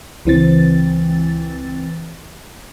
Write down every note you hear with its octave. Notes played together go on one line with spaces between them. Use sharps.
C#2 E3 C4 A6